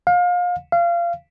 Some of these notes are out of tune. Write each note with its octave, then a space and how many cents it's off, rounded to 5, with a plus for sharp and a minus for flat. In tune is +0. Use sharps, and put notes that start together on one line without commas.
F5 +30
F5 -25